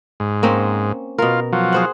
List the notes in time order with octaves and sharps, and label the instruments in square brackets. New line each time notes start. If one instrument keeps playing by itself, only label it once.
[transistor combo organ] G#2
[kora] A#3 C4 C#4
[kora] B2 A#4 [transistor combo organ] F4
[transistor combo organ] F3 F#3
[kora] G#4 C5 F#5